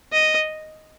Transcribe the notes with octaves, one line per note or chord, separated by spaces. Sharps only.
D#5